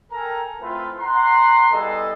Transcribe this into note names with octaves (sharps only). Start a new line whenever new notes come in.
A4 A#4 G5 G#5 A#5
A3 C4 E4 F4 B4
F#5 A#5 C6
G3 B3 E4 G#4 A4 D#5